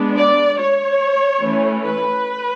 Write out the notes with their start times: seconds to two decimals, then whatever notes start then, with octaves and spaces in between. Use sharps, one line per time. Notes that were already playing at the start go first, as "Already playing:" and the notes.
Already playing: G#3 B3 D4
0.17 D5
0.60 C#5
1.42 E3 A3 C#4
1.84 B4